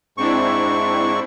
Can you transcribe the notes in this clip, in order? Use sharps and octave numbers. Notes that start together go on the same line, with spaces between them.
G#2 C4 D4 E4 C#6